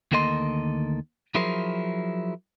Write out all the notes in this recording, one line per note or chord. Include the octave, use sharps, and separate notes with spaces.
D2 D#3 A#3 A4 D#5 C6
F3 F#3 E4 G#4 A#4 C5